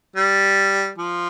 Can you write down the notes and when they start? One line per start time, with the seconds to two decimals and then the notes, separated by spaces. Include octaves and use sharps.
0.16 G3
0.98 F3